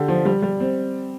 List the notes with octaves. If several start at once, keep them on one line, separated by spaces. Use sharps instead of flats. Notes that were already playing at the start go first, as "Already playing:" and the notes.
Already playing: D3 G4
F3
G3
G3
C4